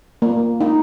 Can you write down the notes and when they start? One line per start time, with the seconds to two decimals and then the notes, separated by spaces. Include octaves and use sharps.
0.22 A#3
0.61 D#4